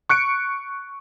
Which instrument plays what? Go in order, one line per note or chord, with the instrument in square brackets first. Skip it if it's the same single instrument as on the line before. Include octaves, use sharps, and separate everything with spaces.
[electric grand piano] C#6 F#6 C#7 D7